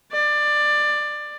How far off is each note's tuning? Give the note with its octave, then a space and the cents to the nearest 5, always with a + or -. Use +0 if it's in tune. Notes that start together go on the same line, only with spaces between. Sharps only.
D5 +15